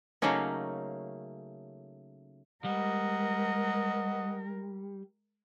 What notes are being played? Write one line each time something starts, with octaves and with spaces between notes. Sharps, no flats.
C#3 F#3 A3 A#3 C#4 D#4
G3 G#3 A#4 D#5 F#5